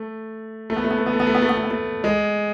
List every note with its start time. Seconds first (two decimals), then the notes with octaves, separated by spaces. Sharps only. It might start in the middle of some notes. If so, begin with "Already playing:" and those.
Already playing: A3
0.70 A3
0.76 B3
0.84 A3
0.91 B3
0.98 A3
1.06 B3
1.13 A3
1.20 B3
1.27 A3
1.35 B3
1.42 A3
1.49 B3
1.57 A3
1.64 B3
1.71 A3
2.04 G#3